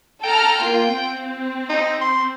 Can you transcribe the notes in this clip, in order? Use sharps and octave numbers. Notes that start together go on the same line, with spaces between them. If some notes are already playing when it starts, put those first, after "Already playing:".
A4 G5 A#5 F6
A#3 F4
C4
D#4
C6